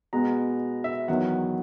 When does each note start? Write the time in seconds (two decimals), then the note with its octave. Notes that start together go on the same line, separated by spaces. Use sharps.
0.13 B2 G#3 B3 A#5
0.84 E5
1.08 E2 D#3 F#3 B3 F#5